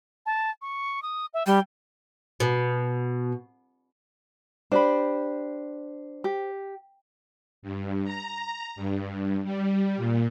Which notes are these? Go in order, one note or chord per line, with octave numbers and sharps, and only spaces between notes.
A5
C#6
D#6
E5
G3 G5
B2
D4 G4 C5 B5
G4
G2
A#5
A#5
G2
G3
A#2